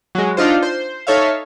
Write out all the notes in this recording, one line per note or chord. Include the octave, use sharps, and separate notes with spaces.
F#3 G#3
D4 D#4 F4 C5
C5
D#4 A4 C#5 E5 F5